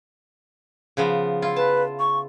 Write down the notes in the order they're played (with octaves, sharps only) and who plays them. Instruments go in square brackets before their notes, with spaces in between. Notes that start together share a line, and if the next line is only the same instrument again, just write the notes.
[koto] C#3 F3 B3
E4 F4
[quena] B4 [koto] A5
[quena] C#6